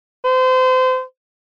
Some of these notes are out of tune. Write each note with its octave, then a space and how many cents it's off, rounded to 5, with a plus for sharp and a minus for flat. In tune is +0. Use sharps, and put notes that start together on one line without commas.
C5 -30